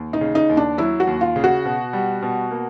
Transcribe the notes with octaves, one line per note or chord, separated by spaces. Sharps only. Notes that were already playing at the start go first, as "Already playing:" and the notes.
Already playing: D#2
D#4
C#3
D#4
D#2
D4
F#3 E4
F#4
D#2
F4
C#3
F#4
B2
G3
B2
A#3